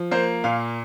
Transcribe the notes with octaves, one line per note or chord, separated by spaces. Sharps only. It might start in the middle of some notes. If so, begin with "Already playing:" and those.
Already playing: F3
A#3 C5
A#2 F5